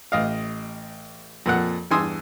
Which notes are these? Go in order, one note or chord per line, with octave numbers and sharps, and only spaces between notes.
A1 D#5 F5
F2 A#2 F#5
E2 G2 G#5 C6 D#6 E6